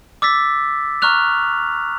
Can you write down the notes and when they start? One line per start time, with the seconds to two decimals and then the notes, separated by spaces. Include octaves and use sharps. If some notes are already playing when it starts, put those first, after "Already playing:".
0.22 D6 E6 A6 B6
1.02 A#5 C#6 F6 F#6 F7